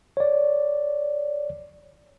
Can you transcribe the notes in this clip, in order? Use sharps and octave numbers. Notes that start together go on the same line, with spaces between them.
C#5 D5